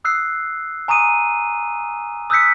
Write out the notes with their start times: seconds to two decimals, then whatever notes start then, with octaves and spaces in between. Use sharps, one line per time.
0.04 D#6 E6 F#6 C7
0.88 G#5 A#5 C#6 D#6 D#7
2.30 D#6 E6 F#6 G6 B6 C#7